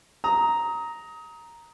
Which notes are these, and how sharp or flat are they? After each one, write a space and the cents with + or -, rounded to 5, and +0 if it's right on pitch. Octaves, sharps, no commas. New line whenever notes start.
A#5 +0 D#6 +25